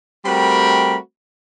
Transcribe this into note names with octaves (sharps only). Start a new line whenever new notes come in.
G3 A3 C4 F#4 A#4 B5